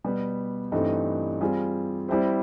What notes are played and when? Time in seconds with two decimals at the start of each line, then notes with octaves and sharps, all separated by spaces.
0.04 B2 G3 B3
0.72 G2 E3 A3 C4 D#4
1.41 G3 C4 F4 G#4
2.08 G3 C4 E4 G4 C5